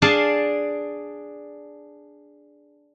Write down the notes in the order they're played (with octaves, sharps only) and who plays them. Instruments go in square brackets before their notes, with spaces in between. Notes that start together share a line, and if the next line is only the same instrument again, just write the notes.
[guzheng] D4 G#4 D5 F5 A5